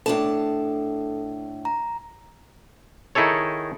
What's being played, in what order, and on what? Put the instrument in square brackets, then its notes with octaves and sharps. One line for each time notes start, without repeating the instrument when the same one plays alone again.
[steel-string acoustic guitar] A2 D4 A5 [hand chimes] A4
[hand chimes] A#5
[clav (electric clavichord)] D#3 D#4 E4 G#4 A4 C#5